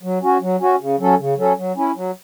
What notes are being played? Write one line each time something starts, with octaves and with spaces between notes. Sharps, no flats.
F#3
C#4 F#4
F#3
C#4 F#4
C#3
F#3 C#4 A4
C#3
F#3 C#4 A4
F#3
C#4 E4
F#3